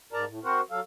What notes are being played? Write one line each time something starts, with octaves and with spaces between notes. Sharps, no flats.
G#2 A#4 D5 A5 A#5
A2
C4 F#4 A#4 C5 F#5
F#3 A4 F5